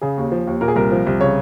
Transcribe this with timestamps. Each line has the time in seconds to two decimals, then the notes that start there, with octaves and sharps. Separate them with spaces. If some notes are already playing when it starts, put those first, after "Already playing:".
0.01 C#3 G#4
0.17 D#2
0.32 F3
0.47 D#2
0.61 A#2 A#4
0.68 G#4
0.76 C2 A#4
0.92 F3
1.07 C2
1.20 C#3 C#5